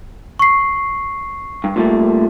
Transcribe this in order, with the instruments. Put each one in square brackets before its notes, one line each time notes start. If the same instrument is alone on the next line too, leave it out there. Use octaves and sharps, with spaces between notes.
[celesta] C#6 C7
[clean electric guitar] G2
A#2 G3 A3